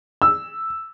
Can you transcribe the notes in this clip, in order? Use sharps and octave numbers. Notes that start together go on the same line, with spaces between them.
E6